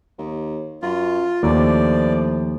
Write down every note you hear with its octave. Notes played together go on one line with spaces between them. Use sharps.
D#2
F#2 F4
D#2 A2 F3 D5